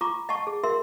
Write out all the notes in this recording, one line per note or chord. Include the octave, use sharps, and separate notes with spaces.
F4 A#5 C#6 D6
D#5 F#5 A5 C#6
G#4
F#4 A#4 E5 C6